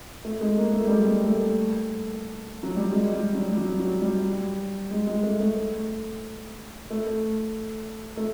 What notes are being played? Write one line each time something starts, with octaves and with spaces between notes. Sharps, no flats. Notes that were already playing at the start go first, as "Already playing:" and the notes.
A3
G#3
A#3
A3
G3
G#3
A3
F#3
G3
G#3
G3
F#3
G3
F#3
F#3
G3
G#3
G#3
A3
A3
A3
A3